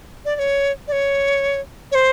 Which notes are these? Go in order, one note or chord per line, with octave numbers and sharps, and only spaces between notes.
D5
D5
C#5
D5
C#5
C#5
C5